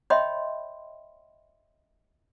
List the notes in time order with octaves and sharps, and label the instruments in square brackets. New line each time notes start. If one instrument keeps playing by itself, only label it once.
[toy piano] C#5 D#5 E5 G5 B5 C6